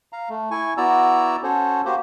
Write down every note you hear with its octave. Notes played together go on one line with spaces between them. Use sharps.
F5 A#5
A3
E4 G#5 C#6
B3 E4 F#4 D5 A#5 E6
C#4 F#4 A4 C5 C#5
A#3 F#4 G4 C5